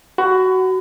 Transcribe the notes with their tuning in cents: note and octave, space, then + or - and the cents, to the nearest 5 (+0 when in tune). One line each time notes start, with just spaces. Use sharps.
F#4 +15 B5 +35